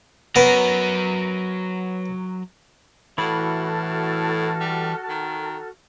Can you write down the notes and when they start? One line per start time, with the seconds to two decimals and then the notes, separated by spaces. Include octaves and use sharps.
0.36 F#3 B3 A#4
3.18 A2 E3 F#4 A4 B5 F6
4.61 G3
5.09 D#3